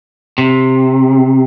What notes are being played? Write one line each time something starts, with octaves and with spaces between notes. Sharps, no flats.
C3